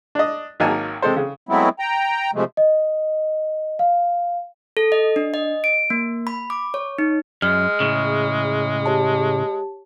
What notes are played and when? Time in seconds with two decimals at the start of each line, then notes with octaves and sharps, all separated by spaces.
0.15 D4 D#5
0.60 G#1 F#3 A#3 D#4 G#5 A5
1.02 C3 G#3 A4 C5
1.16 C#3
1.49 F#3 G#3 A3 B3 C4 E4
1.79 G5 A#5
2.34 C3 F3 G#3 A3
2.57 D#5
3.79 F5
4.77 A4
4.92 D#5
5.16 D4
5.34 D#5
5.64 D7
5.90 A#3
6.27 B5
6.50 D6
6.74 C#5
6.98 D#4
7.42 F#2 G#3 F6
7.80 A2 C#3
8.86 G4 C#5 A5